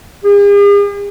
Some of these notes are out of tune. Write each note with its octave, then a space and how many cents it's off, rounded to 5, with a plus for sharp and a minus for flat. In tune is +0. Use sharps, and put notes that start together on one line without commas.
G#4 -45